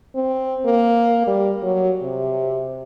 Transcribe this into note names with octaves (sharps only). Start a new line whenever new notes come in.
C4
A#3
G3
F#3
C3